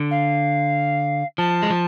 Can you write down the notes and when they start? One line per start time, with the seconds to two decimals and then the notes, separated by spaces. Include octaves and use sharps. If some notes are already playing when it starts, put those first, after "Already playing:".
Already playing: D3
0.11 F5
1.38 F3 A5
1.63 G#3
1.70 F3